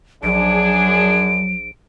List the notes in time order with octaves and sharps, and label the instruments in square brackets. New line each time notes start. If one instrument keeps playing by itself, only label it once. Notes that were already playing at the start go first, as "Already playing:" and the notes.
[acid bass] A#1 [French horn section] F#2 D4 G#4 [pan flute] F#3 [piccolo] D7